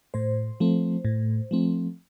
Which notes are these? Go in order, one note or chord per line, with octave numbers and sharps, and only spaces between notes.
A2 C5
F3 A3 C4
A2
F3 A3 C4